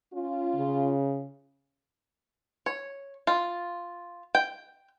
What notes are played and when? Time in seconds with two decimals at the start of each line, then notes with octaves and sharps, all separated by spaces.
0.14 C#4 F4
0.56 C#3
2.66 C#5
3.27 F4
4.35 G5